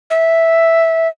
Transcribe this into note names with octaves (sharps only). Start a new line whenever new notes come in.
E5